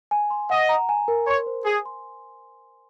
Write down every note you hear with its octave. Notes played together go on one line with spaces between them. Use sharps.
G#5
C6
D#5 F#5
A#5
G#5
A#4
C#5 C6
C5
G#4 G#5
C6